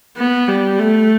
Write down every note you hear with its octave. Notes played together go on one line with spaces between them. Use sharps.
B3
G3
A3